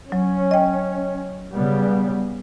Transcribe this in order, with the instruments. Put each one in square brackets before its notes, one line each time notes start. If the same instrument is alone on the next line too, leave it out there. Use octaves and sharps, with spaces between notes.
[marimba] F#3 [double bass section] C#4
[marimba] D#5 G5
[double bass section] C#3 G3 B3